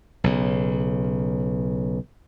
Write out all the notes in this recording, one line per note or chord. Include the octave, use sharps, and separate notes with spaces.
B1 C#3